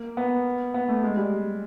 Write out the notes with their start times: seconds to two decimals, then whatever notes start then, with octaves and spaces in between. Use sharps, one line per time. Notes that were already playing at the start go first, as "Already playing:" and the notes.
Already playing: A#3
0.17 B3
0.74 B3
0.89 A3
1.03 G#3
1.17 G3